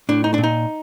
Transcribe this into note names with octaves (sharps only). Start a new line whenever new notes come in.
A2 D4
D#4
A#2 D4
D#4